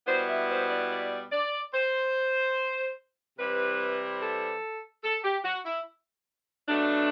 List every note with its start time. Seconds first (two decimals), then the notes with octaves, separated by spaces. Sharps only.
0.07 B2 G3 B3 E4 C5
0.28 E5
0.50 C5
0.69 D5
0.91 D5
1.32 D5
1.74 C5
3.38 C3 E3 G3 C4 E4 B4
4.21 A4
5.04 A4
5.24 G4
5.45 F#4
5.65 E4
6.69 B2 F#3 A3 D4